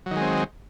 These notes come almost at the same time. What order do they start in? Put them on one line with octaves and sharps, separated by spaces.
F#3 D#3 G#3 C4